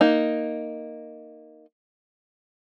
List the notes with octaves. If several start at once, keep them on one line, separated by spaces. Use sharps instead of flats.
A#3 D#4